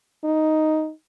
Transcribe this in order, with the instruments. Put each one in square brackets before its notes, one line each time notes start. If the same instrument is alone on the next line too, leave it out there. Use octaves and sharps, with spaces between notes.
[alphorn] D#4